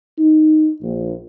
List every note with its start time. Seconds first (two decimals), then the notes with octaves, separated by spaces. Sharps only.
0.18 D#4
0.82 A#1